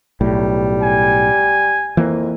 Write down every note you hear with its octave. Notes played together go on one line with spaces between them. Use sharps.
B1 A2 G3
G#5
F2 E3 A#3